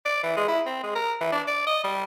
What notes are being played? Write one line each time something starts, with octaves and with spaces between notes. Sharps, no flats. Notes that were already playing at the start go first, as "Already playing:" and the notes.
D5
E3
G#3
E4
C4
G#3
A#4
E3
D4
D5
D#5
G3